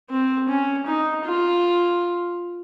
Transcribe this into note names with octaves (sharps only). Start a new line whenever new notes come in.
C4
C#4
D#4
F4